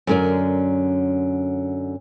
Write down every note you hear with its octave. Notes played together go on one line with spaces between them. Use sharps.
F#2 D3 C#4 A#4 D5